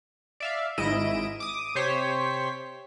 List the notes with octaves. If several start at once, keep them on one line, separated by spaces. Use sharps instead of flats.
D5 E5 F5
G#1 G#2 E4 D#5 D7 E7
D6 D#6
C3 G4 C5 C#5 B6